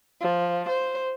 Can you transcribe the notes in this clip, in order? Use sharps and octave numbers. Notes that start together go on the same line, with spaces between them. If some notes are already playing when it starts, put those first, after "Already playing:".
F3
C5